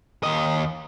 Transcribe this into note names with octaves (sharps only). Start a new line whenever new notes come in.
D#2 D#5